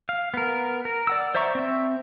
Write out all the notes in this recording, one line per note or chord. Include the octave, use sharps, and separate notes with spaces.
F5
B3 A#4
A#4
D5 F#5 E6
C5 D5 E5 A#5 C#6
C4 E5